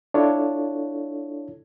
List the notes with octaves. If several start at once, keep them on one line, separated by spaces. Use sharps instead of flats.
D4 E4 F4 A4 C#5